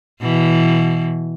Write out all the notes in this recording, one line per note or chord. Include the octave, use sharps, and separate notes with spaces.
B2 E3